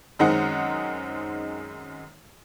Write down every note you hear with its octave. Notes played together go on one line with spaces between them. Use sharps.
F#2 D#3 G#3 C4 D#4 F#5